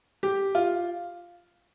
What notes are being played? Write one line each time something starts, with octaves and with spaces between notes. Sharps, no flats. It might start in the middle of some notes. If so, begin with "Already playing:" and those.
G4
F4